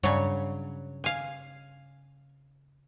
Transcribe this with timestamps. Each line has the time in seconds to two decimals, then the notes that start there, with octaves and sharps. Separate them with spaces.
0.03 G2 C#3 F#3 C#5
1.04 F5 G#5